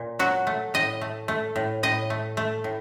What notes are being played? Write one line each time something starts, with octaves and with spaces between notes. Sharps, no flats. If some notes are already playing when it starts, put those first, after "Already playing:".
Already playing: A#2
F#3 F#4
A3
A2 D#5
A3
A3
A2
A2 D#5
A3
A3
A2